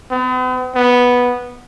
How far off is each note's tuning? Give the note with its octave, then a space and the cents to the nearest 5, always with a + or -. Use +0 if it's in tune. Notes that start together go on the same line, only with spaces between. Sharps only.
B3 +45
B3 -5